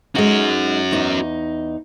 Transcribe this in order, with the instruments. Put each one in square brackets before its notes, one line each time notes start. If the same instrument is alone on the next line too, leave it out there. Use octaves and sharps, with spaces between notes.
[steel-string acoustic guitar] G#3 D#4 [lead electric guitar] C#4 F#4
[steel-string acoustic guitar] E2 D#4